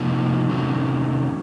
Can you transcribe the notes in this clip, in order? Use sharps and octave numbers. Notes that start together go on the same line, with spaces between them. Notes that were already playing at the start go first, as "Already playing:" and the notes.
Already playing: C3 F3 A#3 D#4 F#4
C3 D#3 F#3 A3 C#4